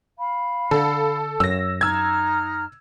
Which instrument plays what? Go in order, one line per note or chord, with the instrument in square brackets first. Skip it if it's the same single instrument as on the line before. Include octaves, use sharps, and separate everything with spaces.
[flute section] F5 B5
[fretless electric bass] D3 [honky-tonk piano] A4
[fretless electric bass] F#2 [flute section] C#5 [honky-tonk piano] E6 A#6
[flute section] D#4 A#5 F6 [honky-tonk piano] E6 G#6